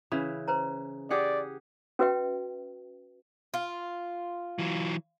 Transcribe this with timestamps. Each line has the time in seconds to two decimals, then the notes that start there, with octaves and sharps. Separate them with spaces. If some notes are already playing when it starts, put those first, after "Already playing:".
0.12 C#3 E3 B4 B5
0.48 B4 C5 A#5
1.10 G4 G#4 D5 F#5
1.99 C#4 F#4 B4 E5 G5
3.54 F4
4.59 E3 F#3